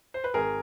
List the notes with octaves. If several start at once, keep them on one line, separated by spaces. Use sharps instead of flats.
C5
B4
G#1 G#4 A#4